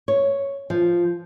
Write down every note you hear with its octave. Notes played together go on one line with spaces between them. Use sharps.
C#5
F3